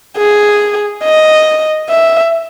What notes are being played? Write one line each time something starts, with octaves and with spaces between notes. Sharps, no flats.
G#4
D#5
E5